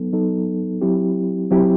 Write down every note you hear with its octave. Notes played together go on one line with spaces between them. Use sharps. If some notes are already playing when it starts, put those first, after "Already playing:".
Already playing: F#3 B3 D#4 A4
F#3 B3 D#4 A4
F#3 C4 E4 G4
F#3 C4 E4 G4